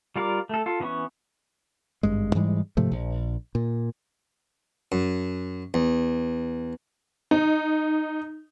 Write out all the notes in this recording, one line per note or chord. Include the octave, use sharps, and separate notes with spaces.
G3 F4 A#4 D5
A3 A4
F4 A4
D#3 E3 B3 C#4 C#6
G#1 G2 G#3
G#2 E3 G3 G#3
G#2 C3 F3 A3
A#1
A#2
F#2
E2
D#4